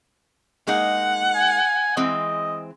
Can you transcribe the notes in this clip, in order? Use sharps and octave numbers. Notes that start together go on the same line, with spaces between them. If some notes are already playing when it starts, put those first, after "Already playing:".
G#3 A#3 D#4 F#5
G#5
E3 G#3 C4 D#5